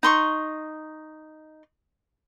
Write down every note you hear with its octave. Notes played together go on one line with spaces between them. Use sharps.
D#4 C6 C#6